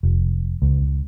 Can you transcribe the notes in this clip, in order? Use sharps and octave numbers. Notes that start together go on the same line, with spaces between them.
F1
C#2